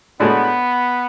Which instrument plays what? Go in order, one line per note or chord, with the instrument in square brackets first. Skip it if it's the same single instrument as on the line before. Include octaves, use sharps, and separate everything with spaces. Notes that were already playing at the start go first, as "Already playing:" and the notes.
[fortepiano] A2 G#3 D4 F#4 [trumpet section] B3